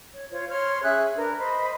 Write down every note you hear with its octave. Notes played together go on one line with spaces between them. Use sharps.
C#5
F4 C5 C#5
C#5 C6 F6
C#4 G#4 E5 F#6
D4 A#4 B4
C5 D#5 B5